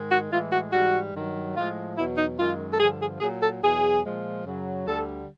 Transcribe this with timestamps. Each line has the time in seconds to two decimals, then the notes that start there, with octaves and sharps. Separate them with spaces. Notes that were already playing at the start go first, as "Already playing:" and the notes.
Already playing: G#2 D#3 G#3
0.11 F#4
0.31 A2 E3 G#3 F4
0.52 F#4
0.73 G#2 E3 G3 F#4
1.14 G2 D#3 F#3
1.55 A2 F3 G#3 F4
1.97 E2 B2 F#3 E4
2.17 D#4
2.38 F#2 D#3 G#3 F4
2.71 A4
2.79 G2 D3 F3 G#4
3.00 G#4
3.21 A#2 F#3 G#4
3.41 A4
3.62 E2 B2 F#3 G#4
4.04 A#2 F3 G#3
4.45 F#2 C#3 F#3
4.86 D2 D3 G3 A4